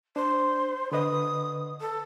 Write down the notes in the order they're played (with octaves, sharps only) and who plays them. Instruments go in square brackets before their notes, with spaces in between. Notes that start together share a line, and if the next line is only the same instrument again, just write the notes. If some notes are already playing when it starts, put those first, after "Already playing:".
[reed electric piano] D4 [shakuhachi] C5
[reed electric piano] D3 B4 D#5 [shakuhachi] D#6
[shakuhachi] A4